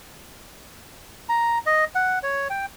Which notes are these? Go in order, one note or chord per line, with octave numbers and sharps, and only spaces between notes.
A#5
D#5
F#5
C#5
G5